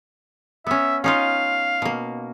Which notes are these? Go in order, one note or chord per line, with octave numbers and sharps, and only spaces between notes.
B3 C#4 E5
C#4 D#4 F4 F5
B2 A#3